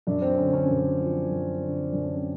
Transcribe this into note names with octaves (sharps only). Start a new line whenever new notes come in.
F#2 D4
C4
D3 C#4
C#4
F#2
F3
F#2
D3
F#2 D4
C#4
C4